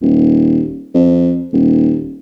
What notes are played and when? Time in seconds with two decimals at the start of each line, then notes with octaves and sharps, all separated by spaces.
0.02 D#1
0.94 F2
1.53 D#1